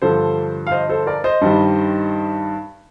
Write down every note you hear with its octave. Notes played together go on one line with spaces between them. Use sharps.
G2 D3 F3 A4 C5
F5
C5 D#5
A4 C5
A#4 D5
C5 D#5
G2 D#3 G3